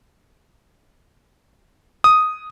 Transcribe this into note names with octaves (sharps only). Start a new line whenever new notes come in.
D#6